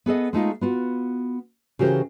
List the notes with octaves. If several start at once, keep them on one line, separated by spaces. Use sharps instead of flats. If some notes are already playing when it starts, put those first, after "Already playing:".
B3 G#4 A4 D#5
G#3 A3 D#4 F4
B3 F4 F#4
C#3 E3 F#4 G4 A#4 C5